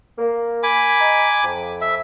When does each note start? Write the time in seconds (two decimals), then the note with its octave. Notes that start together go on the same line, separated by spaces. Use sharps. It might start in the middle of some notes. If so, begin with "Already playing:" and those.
0.18 A#3
0.63 G#5 B5 D6
1.00 D#5 A#5
1.43 F2
1.81 E5